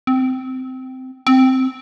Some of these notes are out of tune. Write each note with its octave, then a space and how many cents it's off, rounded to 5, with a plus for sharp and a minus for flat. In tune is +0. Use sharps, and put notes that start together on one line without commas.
C4 -15
C4 -5